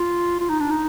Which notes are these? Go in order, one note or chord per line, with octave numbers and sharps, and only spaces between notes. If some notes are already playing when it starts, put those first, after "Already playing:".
Already playing: F4
F4
D#4
D4
D#4